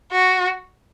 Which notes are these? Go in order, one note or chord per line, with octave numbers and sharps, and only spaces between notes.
F#4